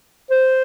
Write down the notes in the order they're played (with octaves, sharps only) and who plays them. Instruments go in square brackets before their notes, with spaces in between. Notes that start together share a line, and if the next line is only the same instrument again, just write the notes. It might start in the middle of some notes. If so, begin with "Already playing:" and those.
[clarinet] C5